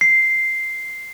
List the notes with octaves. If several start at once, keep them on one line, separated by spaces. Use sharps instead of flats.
C7